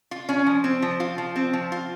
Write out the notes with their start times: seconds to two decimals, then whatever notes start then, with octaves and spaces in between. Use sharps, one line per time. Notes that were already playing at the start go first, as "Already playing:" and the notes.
0.11 F4
0.29 C#4
0.46 F3
0.64 C4
0.82 F3
1.00 F4
1.18 F3
1.36 C4
1.53 F3
1.72 F4